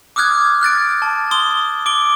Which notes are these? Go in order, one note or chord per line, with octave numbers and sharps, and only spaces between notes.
D6 D#6 F6 F#6 G#6
F6 F#6 A6 D7
A5
C6 D#6 G7
D6 D7 G7